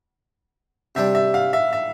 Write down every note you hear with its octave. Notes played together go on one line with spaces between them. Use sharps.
C3 G3 D4 G4 E5
E5
F5
E5
E5